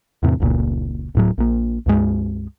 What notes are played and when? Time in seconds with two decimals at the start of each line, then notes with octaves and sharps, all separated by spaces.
0.23 E2 A2 C3
0.40 F1 C#2 A#2
1.15 D1 A2 F#3
1.38 A#1 A#3
1.86 C#2 G2 G#3